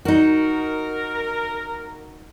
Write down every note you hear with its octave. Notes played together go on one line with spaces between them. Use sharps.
D#4 F#4 A#4